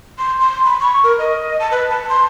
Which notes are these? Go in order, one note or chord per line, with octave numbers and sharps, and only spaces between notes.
C6
C6
B5
C#6
A#4
D#5
A5
B4
A5
C6